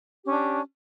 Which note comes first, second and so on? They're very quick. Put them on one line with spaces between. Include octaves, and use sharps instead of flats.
G4 C#4 D4